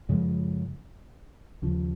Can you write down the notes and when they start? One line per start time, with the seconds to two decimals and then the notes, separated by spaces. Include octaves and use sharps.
0.09 F#2 C#3 F3 G#3
1.62 D#2 C#3 F3